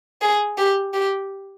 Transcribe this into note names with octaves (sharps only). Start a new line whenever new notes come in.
G#4
G4
G4